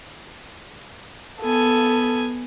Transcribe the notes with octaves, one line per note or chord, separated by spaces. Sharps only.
B3 A4 G#5